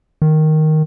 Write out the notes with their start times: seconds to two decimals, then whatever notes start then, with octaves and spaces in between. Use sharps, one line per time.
0.22 D#3